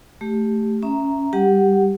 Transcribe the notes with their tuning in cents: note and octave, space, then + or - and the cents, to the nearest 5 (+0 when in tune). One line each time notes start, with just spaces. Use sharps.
A3 +0 G4 +5
C#4 +0 E5 +0 A#5 +0
G3 +0 G4 +0 F#5 +0